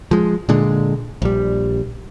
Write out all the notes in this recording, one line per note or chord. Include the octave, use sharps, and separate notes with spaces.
F3 G#3
A#2 D3 G#3
A#1 G3